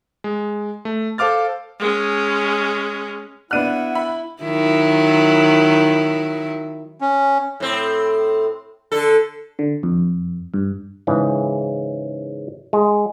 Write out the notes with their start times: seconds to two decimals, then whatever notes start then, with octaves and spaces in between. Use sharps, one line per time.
0.24 G#3
0.85 A3
1.18 A4 C5 F5 D6 F6 A6
1.79 G#3 C#4
3.51 B3 D4 E4 F#5 F6 F#6 D#7
3.95 E5 B5
4.43 D#3 F#3 E4
7.01 C#4
7.60 A2 C4
8.92 D3 A4
9.59 D3
9.83 F2
10.54 G2
11.07 G#2 C#3 E3
12.73 G#3